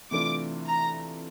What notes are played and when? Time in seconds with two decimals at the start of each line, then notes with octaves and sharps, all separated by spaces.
0.11 C3 E3 A3 D4 F4 D6
0.66 A#5